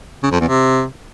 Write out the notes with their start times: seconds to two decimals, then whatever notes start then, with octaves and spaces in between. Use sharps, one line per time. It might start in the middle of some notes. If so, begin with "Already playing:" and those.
0.23 C#3
0.32 F2
0.40 E2
0.49 C3